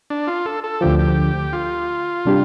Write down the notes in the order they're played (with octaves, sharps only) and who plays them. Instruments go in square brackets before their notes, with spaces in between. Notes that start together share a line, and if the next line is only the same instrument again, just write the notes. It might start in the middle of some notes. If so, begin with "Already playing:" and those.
[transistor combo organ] D4
F4
A4
A4
[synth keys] D2 D3 F3 [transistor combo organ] G4
[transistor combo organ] G4
F4
[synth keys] C3 G3 D4 G4